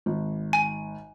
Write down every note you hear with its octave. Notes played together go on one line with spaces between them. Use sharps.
G#1
G#5